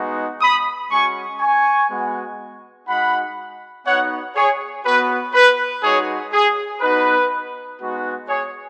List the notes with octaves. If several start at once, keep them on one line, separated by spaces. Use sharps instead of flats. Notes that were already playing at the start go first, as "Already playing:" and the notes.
Already playing: G#3 B3 D#4 F#4
B5 D#6
G#3 C#4 F#4 G#5 C#6
G#5 C#6
G#3 B3 F#4
G#3 D#4 F#4 F#5 B5
B3 D#4 F#4 C#5 F#5
G#4 C#5
B3 F#4 B4
B4
G#3 D#4 F#4 G#4 C#5
G#4
B3 D#4 F#4 B4
G#3 B3 D#4 F#4
G#4 C#5